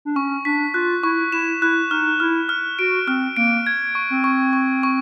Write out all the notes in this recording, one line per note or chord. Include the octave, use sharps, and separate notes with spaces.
D4
C#4 C#6
D4 B6
F4 F#6
E4 C#6
E4 E7
E4 F#6
D#4 F6
E4 F6
F6
F#4 D7
C4 F6
A#3 D7
G#6
C#6
C4
C#6
C#6
C#6